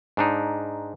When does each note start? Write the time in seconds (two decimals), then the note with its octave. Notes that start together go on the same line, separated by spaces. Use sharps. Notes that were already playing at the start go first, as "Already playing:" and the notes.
0.17 G#2 D4 D#4